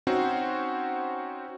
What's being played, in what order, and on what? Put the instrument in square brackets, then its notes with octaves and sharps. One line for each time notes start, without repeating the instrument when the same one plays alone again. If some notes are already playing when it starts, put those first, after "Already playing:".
[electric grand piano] C4 C#4 D#4 F#4 C5